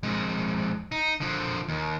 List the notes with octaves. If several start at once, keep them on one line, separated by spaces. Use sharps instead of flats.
F2 G#3
D#4
D3 F3
D#2